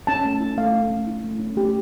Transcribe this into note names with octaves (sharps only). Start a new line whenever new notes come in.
C#4 A5
A3
E4
A3 F5
C#4
A3
E4
A3
C#4
A3 G4